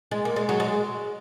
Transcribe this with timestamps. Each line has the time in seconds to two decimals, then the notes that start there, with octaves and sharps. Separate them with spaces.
0.11 G#3
0.25 A#3
0.36 G#3
0.49 F#3
0.60 G#3